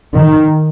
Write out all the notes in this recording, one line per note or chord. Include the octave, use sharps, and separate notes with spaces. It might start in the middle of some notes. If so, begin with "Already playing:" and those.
D#3